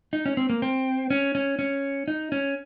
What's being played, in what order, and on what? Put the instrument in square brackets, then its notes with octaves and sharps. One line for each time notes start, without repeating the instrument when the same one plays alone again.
[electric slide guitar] D#4
C#4
C4
A#3
C4
C#4
C#4
C#4
D#4
C#4